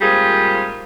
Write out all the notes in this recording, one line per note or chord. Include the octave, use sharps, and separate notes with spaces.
G#2 G3 A#3 C4 F4 G#4